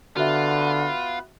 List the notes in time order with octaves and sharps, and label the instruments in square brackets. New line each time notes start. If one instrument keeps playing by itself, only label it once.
[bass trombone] D3 [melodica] B3 B4 [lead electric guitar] F4 [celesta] F#4 E5